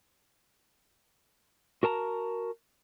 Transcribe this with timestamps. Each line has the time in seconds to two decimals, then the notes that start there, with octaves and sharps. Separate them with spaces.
1.83 F#4 A#4 A5 A#5